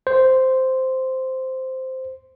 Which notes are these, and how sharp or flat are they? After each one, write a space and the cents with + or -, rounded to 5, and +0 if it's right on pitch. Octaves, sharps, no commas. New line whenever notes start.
C5 -5